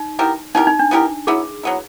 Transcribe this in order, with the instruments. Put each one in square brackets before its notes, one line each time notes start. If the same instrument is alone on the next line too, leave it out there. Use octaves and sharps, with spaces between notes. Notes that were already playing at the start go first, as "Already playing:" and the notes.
Already playing: [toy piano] D#4
[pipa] B3 E4 G4 A#4
[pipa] B3 E4 G4 A#4 [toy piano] D#4
[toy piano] D#4
D4
[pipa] B3 E4 G4 A#4
[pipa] F#3 B3 E4 [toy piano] G#4
[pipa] F#3 B3 E4